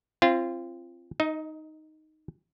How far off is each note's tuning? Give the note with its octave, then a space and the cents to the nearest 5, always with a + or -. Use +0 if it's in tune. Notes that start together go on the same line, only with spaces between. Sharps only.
C4 +15 F4 -25
D#4 +0 D#5 +30